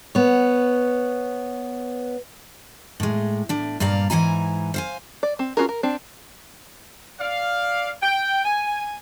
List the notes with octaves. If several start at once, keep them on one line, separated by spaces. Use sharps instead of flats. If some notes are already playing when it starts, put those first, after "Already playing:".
B3 C#5
A2 G#3
A2 D4
G2 A#2 D5 F5 A#5
G#2 E3 E4 G#5 A#5
C5 F5 G#5
D5
C4
C#4 F4 F#4 G#4 A#4
A#4
C4 D4
D5 F5
G5
G#5